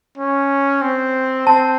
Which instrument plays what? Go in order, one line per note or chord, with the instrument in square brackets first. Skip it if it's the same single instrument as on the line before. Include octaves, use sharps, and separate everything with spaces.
[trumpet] C#4
C4
[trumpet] C4 [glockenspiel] A5